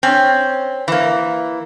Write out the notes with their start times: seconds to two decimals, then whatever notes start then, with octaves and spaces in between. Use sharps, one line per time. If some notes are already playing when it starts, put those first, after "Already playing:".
0.03 C4 C#4
0.88 E3 A#3